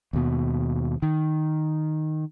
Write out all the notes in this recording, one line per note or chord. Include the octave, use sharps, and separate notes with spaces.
D#2 B2
D#3